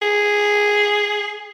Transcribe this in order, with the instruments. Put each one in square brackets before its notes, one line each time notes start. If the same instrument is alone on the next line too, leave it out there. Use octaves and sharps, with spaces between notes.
[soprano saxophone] G#4